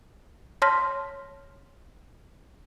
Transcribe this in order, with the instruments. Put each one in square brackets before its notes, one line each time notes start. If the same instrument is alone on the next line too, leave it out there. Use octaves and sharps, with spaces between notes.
[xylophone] C#5 A5 C6 F6 A#6 B6